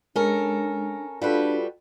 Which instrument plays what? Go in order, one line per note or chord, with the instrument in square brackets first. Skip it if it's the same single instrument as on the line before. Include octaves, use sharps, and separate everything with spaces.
[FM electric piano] G#3 [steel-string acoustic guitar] C#4 A4 A#4 [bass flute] D4
[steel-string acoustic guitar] G3 F#4 B4 [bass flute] D4 [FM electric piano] F4 A4